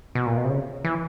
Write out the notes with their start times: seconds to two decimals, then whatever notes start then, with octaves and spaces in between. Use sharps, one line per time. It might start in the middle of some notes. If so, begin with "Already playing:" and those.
0.15 B2
0.26 A#2
0.37 B2
0.45 C3
0.49 C#3
0.84 E3